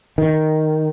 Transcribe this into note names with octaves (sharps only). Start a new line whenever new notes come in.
D#3